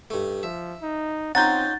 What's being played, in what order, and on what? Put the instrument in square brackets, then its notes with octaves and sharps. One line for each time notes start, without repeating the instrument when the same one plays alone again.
[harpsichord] G2 A3
[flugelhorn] F3 [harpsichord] E5
[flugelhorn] D#4
[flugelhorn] C4 [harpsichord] C#4 D#4 F4 [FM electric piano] F#5 A#5 G6 [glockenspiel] A6